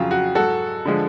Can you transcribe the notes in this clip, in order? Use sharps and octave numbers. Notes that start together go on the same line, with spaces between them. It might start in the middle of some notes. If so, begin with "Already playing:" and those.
Already playing: F2 C#3 F#3 F4
F#4
G#2 F#3 F#4 A4
D3 F3 G#3